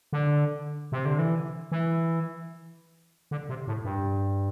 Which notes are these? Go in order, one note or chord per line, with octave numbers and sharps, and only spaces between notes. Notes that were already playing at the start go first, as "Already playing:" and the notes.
D3
C3
D3
E3
E3
D3
C3
A2
G2